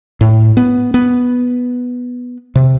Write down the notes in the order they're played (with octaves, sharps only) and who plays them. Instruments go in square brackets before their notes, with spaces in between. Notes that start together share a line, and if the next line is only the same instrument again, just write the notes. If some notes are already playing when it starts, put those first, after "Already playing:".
[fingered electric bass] A2
B3
B3
C3